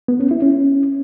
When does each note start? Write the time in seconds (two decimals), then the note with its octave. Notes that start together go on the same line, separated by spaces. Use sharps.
0.08 B3
0.20 C#4
0.31 E4
0.42 C#4